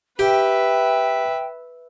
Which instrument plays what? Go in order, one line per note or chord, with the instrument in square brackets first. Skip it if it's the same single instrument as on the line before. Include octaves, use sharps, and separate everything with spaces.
[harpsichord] G4 [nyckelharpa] B4 E5 [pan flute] G5